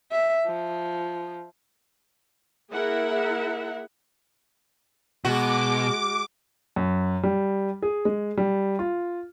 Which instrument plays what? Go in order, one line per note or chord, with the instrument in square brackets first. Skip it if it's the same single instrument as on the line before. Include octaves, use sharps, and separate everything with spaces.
[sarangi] E5
F3
[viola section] A#3 E4 G#4 A#4 E5 F#5
[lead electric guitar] B2 [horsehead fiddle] G#3 [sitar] F#4 [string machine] D6
[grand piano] F#2
G3
G#4
G#3
G3
F4